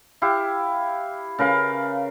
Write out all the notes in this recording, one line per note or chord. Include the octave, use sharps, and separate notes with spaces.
E4 G4 F5
C#3 A#4 B4 F5